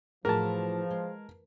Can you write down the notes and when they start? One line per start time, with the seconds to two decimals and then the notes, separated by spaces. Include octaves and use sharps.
0.25 A2 E3 F3 F#4 G#4 A#4 A5
0.91 G#3